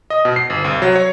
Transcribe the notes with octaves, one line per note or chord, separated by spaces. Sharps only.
D#5
B2
C7
G1
C2
F#3
C#5